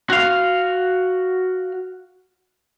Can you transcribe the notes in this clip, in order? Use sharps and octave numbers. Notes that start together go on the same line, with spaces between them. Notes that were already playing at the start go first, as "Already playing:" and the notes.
F#4 F5